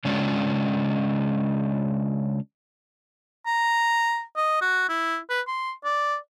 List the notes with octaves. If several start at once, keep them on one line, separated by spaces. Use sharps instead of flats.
C#3 G#3 C#4 D4 F4
A#5
D#5
F#4
E4
B4
C6
D5